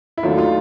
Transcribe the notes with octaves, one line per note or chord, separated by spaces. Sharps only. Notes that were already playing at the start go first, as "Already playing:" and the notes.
E4
D#2 D#3 F#3 A3 D4 F4
F4